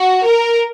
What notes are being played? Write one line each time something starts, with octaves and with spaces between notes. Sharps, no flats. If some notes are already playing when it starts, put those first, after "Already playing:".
Already playing: F#4
A#4